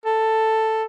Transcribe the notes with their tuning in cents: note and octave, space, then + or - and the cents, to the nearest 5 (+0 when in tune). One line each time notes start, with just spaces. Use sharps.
A4 +5